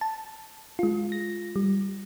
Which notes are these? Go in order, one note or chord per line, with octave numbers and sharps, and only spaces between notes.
A5
G#3 F4
A#6
G3